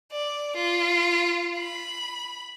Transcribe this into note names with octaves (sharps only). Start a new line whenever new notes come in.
D5
F4
B5